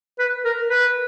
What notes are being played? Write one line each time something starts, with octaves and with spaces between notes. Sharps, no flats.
B4
A#4
B4